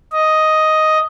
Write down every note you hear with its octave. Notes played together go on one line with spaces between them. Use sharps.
D#5